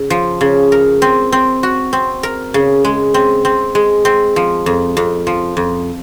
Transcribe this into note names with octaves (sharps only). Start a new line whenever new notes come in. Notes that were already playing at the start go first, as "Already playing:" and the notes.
Already playing: C#3
F3
C#3
A#4
C4
C4
F#4
C4
A#4
C#3
G#3
C4
C4
G#3
C4
F3
F2
F2
F3
F2